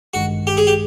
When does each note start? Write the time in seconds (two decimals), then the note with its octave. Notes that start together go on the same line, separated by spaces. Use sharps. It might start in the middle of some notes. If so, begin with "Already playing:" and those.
0.14 A1 G2 D#3 G#3 F#4
0.47 G4
0.57 G#4
0.67 G4